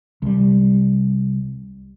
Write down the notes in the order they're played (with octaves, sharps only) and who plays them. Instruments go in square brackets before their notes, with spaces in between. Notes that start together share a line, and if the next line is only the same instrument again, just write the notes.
[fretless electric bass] C2 G3